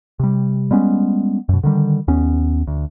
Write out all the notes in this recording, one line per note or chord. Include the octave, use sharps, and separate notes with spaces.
C3 G3
G3 G#3 B3 C#4
F#2 B2
D3 D#3 G3
D#2 B3 C#4
D2